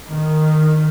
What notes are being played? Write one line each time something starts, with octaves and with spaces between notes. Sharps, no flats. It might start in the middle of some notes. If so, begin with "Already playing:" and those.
D#3